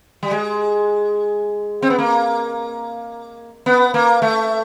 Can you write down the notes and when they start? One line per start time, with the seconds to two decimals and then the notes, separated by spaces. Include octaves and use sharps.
0.23 G3
0.31 G#3
1.82 C4
1.90 B3
1.98 A#3
3.66 B3
3.94 A#3
4.22 A3